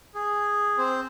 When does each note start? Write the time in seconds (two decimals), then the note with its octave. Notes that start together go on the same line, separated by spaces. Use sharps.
0.15 G#4
0.78 C4 C5